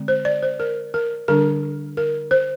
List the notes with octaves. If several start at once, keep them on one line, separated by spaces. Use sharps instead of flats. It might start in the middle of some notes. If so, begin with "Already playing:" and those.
Already playing: D3 G#3 C4
C5
D5
C5
A#4
A#4
D3 G3 D4 A#4
A#4
C5